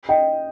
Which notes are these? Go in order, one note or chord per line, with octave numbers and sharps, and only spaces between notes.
D#5 G5